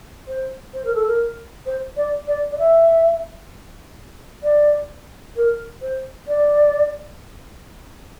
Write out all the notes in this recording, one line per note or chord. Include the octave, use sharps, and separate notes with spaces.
C5
C5
A#4
A4
A#4
C5
D5
D5
D5
E5
D5
A#4
C5
D5